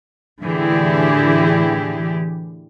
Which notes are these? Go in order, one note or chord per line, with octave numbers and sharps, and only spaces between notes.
A2 D3 E3 E4 G4 G#4